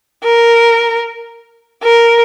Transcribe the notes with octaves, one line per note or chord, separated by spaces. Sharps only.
A#4
A#4